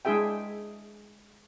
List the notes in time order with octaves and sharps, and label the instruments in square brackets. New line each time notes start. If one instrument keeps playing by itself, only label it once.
[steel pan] G#3 D4 E4 G#4 E5 G5